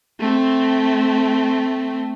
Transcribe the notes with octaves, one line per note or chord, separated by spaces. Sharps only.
A3 C4